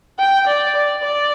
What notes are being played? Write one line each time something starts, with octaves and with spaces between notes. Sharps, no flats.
G5
D5
D5
D5